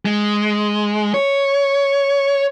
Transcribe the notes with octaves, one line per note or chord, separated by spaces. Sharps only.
G#3
C#5